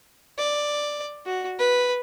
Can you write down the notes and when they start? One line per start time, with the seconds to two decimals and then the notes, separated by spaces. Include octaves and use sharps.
0.38 D5
1.26 F#4
1.59 B4